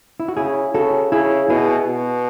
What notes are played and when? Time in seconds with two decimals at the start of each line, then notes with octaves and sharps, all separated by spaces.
0.20 E4
0.28 F#4
0.37 C#3 E4 G#4
0.74 C#3 F#4 A4
1.12 C#3 E4 G#4
1.50 B2 E4 G#4
1.88 B2